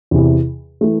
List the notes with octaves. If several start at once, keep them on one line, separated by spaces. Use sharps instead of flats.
E2 C3 E3
E3 A3